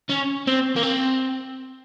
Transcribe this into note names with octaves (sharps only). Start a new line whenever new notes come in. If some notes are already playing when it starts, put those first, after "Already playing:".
C#4
C4
A#3
C4